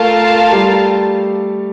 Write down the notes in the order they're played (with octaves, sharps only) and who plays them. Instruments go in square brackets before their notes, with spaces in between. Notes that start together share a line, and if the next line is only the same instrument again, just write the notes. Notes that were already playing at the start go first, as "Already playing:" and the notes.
Already playing: [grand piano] A3 A4 [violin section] F4 A#4 F5 A5
[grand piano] G3 G4